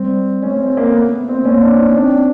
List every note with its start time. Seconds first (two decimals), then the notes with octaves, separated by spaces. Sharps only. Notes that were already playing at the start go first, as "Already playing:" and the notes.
Already playing: G3 C4
0.43 A3 C#4
0.60 C4
0.77 A#3
0.94 B3
1.29 C4
1.45 A#3 C#4
1.62 D4
1.79 D#4
1.96 C4 D4